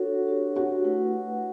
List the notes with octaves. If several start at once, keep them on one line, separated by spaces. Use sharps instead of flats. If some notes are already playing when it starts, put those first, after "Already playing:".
Already playing: D4 F#4 A4 C#5
D4 G4 C#5
F#4
A3 E4 B4 F#5